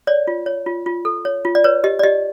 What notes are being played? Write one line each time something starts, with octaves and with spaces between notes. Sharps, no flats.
C#5 D5
F4
C#5
F4
F4
A4
C#5
F4
D5
B4 C#5
G4 D#5
D5
G4 D#5